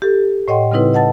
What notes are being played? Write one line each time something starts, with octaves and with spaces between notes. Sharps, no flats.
G4 A4
A2 C#5 D#5 F#5 G5 C6
C#3 G3 C4 D#4 E4 B4
E4 D#5 F#5 A5 A6